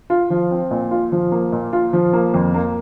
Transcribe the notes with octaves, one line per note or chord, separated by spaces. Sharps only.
F4
F3
C4
A#2
F4
F3
A#3
A#2
F4
F3
A#3
F2
A#3